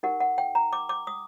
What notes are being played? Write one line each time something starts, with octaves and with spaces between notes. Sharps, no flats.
D#4 G4 A#4 F#5
F#5
G5
A#5
D6
D6
D#6